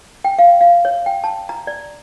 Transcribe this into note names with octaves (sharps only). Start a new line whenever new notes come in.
G5
F5
F5
C#5
G5
A5
A#5
D5